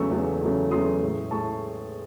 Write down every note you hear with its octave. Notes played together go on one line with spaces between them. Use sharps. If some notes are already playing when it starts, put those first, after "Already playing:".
Already playing: E2 C#3 F#3 A3 C#6 E6
E2 C#3 F#3 A3
E2 C#3 F#3 A3
E2 C#3 F#3 A3 C6 D#6
A2 G#3
A2 G#3 A5 C#6